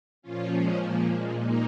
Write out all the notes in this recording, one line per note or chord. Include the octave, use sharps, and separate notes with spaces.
A#2 F3 C#4 F4
G#3 C#4
F3 A#3
G#3
A#3 D#4